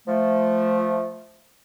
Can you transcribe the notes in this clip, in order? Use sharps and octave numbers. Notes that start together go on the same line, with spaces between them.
F3 A3